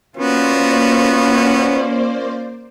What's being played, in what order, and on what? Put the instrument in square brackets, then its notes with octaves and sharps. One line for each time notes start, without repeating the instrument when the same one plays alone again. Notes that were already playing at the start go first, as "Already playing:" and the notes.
[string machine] A#3 C5 D5 [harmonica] B3 F#4 [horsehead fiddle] C#4 F4